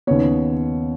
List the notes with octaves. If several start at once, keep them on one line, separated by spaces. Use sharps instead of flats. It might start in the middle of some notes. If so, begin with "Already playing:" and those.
D#2 C#3 B3 C#5